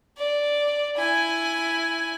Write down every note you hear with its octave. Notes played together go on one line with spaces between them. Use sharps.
D5
E4 G#5